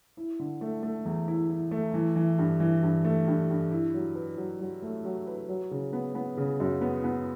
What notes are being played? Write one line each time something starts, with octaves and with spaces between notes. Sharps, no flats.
E4
D3
A3
A3
E2
E4
E4
A3
E3
E3
G2
E3
G2
A3
G2
G2
E4
F#3
B4
F#3
F#3
A3
F#3
B4
F#3
C#3
B3
B3
C#3
F#2
B3
B3